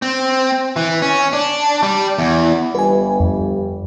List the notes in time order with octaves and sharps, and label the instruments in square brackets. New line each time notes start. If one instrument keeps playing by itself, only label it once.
[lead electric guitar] C4
E3
C#4
D4
G3
E2
[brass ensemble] G1 G3 [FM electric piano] B4 G#5
[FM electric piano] F2